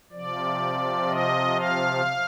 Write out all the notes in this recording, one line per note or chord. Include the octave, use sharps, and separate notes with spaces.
C3 F3 D5
D#5
F5